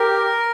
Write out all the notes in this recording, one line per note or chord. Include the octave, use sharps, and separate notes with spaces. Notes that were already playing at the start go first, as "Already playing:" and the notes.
Already playing: G4 A#4